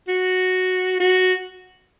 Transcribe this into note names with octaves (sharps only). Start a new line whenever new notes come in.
F#4
F#4